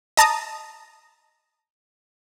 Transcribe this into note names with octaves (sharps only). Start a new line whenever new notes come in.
D#5 A5 A#5 D#6